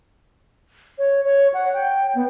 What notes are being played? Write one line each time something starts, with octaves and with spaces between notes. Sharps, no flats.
C#5
C#5
F#5
G5
B3